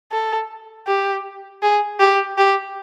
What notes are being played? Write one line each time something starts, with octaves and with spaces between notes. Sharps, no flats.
A4
G4
G#4
G4
G4